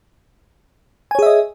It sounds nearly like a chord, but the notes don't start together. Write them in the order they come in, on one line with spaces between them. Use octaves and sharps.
G#5 C#5 G#4 E5 D#5